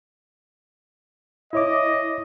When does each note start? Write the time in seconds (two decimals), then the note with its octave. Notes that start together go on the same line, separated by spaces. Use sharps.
1.53 E4 C#5 D#5 D6